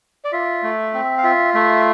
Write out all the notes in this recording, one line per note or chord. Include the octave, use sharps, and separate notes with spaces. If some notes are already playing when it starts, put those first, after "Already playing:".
D5
F4 E5
A3
C4
F5
F4 E5
A3 E5